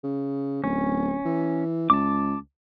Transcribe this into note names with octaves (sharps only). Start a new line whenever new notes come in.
C#3
D1 C#4
E3
C#2 A5 D6